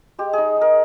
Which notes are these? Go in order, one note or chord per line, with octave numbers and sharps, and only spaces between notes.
G#3 G4
D#4 G#4
D#4 A#4